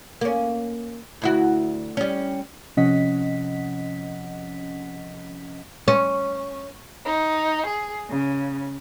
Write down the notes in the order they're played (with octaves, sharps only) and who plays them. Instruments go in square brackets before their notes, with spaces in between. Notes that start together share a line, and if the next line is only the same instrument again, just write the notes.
[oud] A#3 C#4
D2 E4 F#4
G3 C#4
[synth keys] C3 F3 C#4 D#5 F#5 B6
[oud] C#4
[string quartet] D#4
G#4
C#3